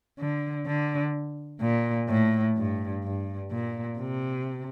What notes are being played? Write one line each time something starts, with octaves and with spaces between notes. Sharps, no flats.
D3
D3
A#2
A2
G2
G2
A#2
C3